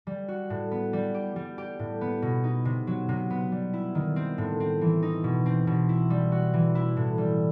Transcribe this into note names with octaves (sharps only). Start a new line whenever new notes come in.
G3
F#4
A2
B3
G3
G4
G3
G4
A2
B3
B2
D#4
C3
F#3
C3
B3
G3
E4
D#3
C4
A2
C4
E3
D#4
B2
C4
B2
E4
G3
F#4
E3
E4
A2
G3